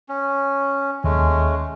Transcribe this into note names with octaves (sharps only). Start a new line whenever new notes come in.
C#4
D#2 G#3 A3 C#4